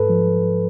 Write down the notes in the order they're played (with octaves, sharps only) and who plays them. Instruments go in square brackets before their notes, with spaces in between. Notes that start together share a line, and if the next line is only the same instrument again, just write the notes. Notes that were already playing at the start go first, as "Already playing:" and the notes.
Already playing: [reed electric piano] G#2 A4 B4
F3